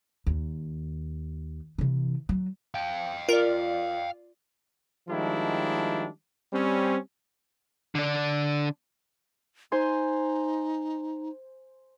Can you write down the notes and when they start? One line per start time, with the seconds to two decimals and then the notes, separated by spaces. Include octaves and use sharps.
0.26 D#2
1.78 C3 E3
2.29 F#3
2.74 F5 G5
3.29 F4 A#4 D5
5.08 D#3 F3 G3 G#3 D4 E4
6.53 G3 C4 C#4
7.95 D3 D4
9.72 D#4 C5 G#5 C6